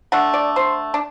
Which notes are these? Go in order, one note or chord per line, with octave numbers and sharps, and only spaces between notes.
D3 A3 D4 F#5
D5
C5
D4